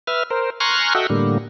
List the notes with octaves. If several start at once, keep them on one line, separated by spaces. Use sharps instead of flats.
B4 E5 F6
A#4 C5
G#5 A#5 C6 C#6 F6 F#6
F#4 A4 D#5 E5 F#5 G5
A2 D3 G3 A#3